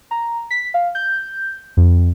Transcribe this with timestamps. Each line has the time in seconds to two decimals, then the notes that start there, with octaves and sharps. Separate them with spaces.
0.11 A#5
0.51 B6
0.74 F5
0.95 G6
1.77 F2